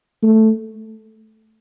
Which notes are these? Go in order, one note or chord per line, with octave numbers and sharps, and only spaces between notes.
A3